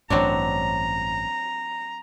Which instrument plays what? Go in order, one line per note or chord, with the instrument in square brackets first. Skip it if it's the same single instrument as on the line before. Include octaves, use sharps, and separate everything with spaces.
[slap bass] A1 G2 [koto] F#3 C4 D4 [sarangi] A#5